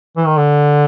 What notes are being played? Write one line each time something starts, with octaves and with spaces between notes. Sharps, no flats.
E3
D#3
D3